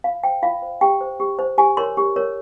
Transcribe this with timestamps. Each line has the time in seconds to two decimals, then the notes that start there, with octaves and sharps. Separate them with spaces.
0.04 F4 F5
0.23 C5 G5
0.43 F4 F5
0.62 C5
0.81 G4 G5
1.01 C5
1.20 G4
1.39 C5
1.58 G4 G#5
1.77 A#4 C#5 C6
1.97 G4
2.16 A#4 C#5